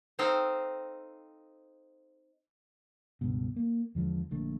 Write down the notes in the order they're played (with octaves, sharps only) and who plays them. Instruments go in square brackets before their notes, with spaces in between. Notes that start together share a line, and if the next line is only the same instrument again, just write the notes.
[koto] C4 D#4 A4 C5 F5 G5
[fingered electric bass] C#2 G2 B2
A#3
E2 D3 F3 G#3
A#1 A#2 D3 A3